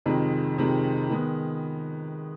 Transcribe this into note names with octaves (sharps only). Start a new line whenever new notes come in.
F2 C3 D#3 G#3
F2 C3 D#3 G#3
D#3 G#3 B3